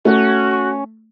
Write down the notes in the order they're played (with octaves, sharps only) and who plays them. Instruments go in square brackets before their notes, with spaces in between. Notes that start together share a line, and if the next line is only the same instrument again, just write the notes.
[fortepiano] A3 [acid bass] C#4 [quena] F#4